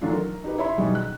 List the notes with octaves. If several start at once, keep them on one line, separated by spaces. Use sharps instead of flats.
D#3 E3 F#3 A3 D4 F4
A#4
D#4 G4 B4
E4 C#5 E5 B5 C6
B2 D#3 G3 G#4
F#6